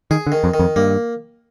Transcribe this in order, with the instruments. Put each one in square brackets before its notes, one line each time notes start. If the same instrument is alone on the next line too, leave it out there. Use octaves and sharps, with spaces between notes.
[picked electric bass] D#3 [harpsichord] G#4
[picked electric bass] D3
[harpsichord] D#3
[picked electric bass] F2
[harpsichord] D#3
[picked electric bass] F2
[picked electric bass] G2 [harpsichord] A#3